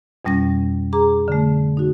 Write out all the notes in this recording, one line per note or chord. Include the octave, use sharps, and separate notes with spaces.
F2 B2 G3 C#4 A#6
G#4 A#5 D6
D3 A3
D#4 F#4